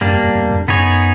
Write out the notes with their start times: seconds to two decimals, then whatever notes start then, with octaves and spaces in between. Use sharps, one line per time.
0.01 F#2 G3 A#3 D4
0.13 E2
0.24 E2
0.35 E2
0.51 F2
0.68 F#2 B3 D#4 G#4 C#5